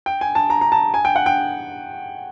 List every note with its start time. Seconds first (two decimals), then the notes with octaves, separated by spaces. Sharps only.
0.06 G5
0.21 G#5
0.35 A5
0.50 A#5
0.61 A#5
0.72 A5
0.94 G#5
1.05 G5
1.16 F#5
1.26 G5